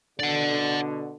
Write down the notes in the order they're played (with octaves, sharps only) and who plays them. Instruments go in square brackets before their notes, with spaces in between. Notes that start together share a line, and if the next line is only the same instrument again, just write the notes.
[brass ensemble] B2 D3 [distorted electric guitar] D5 F#5